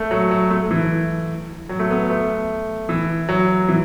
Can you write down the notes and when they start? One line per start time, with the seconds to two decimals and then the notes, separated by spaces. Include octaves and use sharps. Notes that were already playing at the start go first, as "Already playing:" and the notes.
Already playing: A3
0.11 F#3
0.31 F#3
0.50 A3
0.71 E3
1.69 F#3
1.79 A3
1.90 B3
2.10 A3
2.89 E3
3.29 F#3
3.69 E3